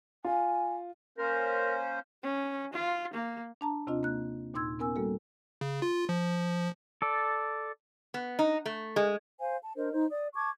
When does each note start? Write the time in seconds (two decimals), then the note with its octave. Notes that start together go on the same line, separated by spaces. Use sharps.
0.24 F4 G#5
1.18 A#3 C#4 A#4 C5
2.23 C#4
2.73 F4
3.14 A#3
3.61 D4 A5 A#5
3.87 D#2 C3 C4 D4 F4 D#5
4.03 A#3 F#6
4.54 D#2 A#2 D#4 C6 E6 G#6
4.79 B3 C#4 A#4 G#5 E6
4.96 G3 A#3 F#4 A4
5.61 C#3
5.82 F4
6.09 F3
7.02 A4 D5
8.14 B3
8.39 D#4
8.66 A3
8.96 G#3
9.40 C5 F5 G#5
9.63 A5
9.75 D4 A#4 C5 D#5
9.92 D#4 C5
10.10 D5 D#6
10.34 A5 C#6 D6 G#6